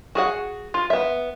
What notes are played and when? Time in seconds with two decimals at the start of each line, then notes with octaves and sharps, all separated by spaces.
0.15 F#4 G#4 F#5
0.74 F4
0.90 B3 E5